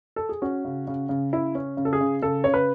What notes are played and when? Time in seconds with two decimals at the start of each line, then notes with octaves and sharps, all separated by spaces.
0.16 A4
0.29 G#4
0.42 C#4 F#4
0.65 C#3
0.87 C#3
1.09 C#3
1.32 C#3 E4
1.55 C#4
1.77 C#3
1.85 A4
1.93 G#4
2.01 C#3
2.22 C#3 A4
2.44 C#3 C#5
2.54 B4